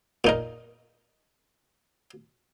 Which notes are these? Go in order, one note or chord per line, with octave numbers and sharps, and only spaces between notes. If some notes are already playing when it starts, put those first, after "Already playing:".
A#2 D#4 A#4